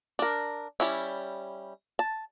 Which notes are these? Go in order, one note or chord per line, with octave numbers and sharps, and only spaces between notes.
D4 A#4
G3 C#4 E4
A5